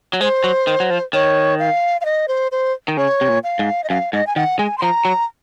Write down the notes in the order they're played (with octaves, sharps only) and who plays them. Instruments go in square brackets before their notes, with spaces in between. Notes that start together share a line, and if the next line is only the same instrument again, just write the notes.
[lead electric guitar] F#3
[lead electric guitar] G#3 [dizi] C5
[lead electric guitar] F#3
D#3
F#3
F3
[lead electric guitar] D#3 [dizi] C#5
[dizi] F5
F5
D#5
C5
C5
[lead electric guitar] D#3
[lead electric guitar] C#3 [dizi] C#5
[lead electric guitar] C3
A#2
[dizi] F5
[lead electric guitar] G#2
[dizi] D#5
[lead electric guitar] F#2 [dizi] F5
[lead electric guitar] G#2 [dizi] D#5
[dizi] G#5
[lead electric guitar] D#3 [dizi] F#5
[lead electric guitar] G#3 [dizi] G#5
[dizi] C6
[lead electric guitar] F3 [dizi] A#5
[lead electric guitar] F#3